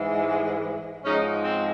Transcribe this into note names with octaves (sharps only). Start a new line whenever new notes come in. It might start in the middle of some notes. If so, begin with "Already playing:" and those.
Already playing: G#2 E3 G#3
G#2 F3 G#3 C#4 D#4
C4